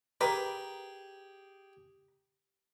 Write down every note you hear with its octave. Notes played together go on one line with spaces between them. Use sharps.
G4 G#4 A#4 B4